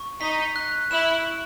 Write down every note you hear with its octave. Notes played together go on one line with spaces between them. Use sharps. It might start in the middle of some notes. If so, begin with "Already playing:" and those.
Already playing: C#6
D#4 B6
F#6
E4 E7
C#6